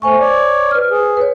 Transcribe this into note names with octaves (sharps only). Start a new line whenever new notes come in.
A3 C5 G#5 C#6
C#5 D5
B4 F6
G#4
B4 C#5